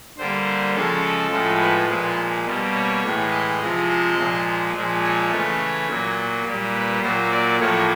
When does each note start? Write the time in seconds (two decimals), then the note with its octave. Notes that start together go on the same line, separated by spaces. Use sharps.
0.18 D3 G3 A#3 C5
0.74 C#3 F3 G#3 A4
1.31 A2 F3 G#3
1.61 B4
1.89 A#2 F3 G#3
2.46 B2 G3 A#3
2.74 C#5
3.03 A2 E3 G#3
3.31 D#5
3.60 C3 F3 G#3
3.89 D#5
4.17 A#2 F3 G#3
4.74 A#2 F3 G#3
5.03 C#5
5.31 C#3 E3 A3
5.88 A#2 F#3 A#3
6.45 A#2 G3 A#3
6.74 B4
7.02 A#2 F#3 A#3 C5
7.31 D5
7.59 A2 F3 A#3 C#5